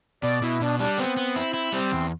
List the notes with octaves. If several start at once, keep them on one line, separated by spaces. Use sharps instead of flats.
B2 D5
B2 E4
B2 D4
G3 D4
B3 C4
B3
E4
E4
G3 C4
E2